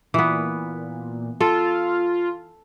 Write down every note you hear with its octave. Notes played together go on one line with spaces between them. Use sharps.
A#2 E3 B3
F4 A4